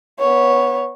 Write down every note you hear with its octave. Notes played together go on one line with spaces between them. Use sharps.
B3 C#5